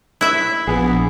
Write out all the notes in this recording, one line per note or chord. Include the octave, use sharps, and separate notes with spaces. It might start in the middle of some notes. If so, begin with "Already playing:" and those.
E4 E5
A#1 B3 G#4